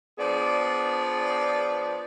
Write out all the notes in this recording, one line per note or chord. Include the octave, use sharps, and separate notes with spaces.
F3 B3 D4 G#4 D5